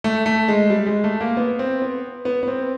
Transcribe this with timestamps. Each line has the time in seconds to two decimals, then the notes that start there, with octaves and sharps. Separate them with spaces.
0.04 A3
0.26 A3
0.48 G#3
0.70 G3
0.86 G#3
1.04 A3
1.21 A#3
1.37 B3
1.59 C4
1.82 B3
2.25 B3
2.43 B3
2.48 C4